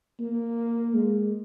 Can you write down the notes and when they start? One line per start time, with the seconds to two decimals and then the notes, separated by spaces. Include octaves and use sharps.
0.19 A#3
0.94 G#3